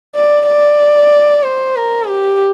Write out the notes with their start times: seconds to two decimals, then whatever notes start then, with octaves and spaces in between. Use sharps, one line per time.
0.15 D5
0.46 D5
1.43 C5
1.76 A#4
2.08 G4